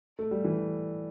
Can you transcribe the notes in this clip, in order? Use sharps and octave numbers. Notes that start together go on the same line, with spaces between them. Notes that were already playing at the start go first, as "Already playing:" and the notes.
A3
G3
E3